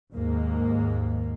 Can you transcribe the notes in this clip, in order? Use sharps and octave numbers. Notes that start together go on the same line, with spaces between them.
D#2 G#2 A#3